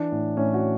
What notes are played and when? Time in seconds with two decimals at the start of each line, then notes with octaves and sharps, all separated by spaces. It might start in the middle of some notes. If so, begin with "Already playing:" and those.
Already playing: E3 D4
0.12 A2
0.37 A2 C#4
0.54 F#4